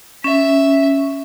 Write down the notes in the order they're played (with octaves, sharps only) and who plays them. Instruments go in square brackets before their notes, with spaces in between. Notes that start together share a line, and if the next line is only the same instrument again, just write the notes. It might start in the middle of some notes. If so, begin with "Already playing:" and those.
[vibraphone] C#4 [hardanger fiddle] E5